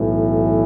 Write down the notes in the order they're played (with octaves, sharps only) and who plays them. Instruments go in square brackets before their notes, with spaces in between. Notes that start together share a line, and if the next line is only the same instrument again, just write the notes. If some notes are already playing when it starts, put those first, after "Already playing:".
Already playing: [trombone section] B1 A2 E3